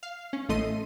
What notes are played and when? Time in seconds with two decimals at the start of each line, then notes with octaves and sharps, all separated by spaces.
0.03 F5
0.33 C#4
0.49 A1 A3 D#5 C6 D#7